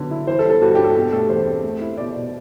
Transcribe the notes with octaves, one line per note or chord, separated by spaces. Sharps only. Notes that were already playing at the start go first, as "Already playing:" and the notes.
Already playing: D3 F#3 B3
E4
E3 C5
A4
G3
A4
G2 F#4
D4 G4
A4
B2 G4
A3 A4
E2 C5
C4
A3
E4
B2 D5
B2